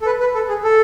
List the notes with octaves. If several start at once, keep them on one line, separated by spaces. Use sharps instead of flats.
A4
B4
B4
A4
G#4
A4